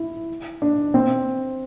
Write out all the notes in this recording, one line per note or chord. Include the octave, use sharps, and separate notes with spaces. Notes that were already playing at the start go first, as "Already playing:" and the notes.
Already playing: E4
D4
C4